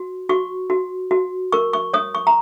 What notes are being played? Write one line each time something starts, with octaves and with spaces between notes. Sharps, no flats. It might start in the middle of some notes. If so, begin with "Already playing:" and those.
Already playing: F#4
F#4 C#6
F#4
F#4
A#4 C#6
C#6
C#5 D#6
C#6
A#5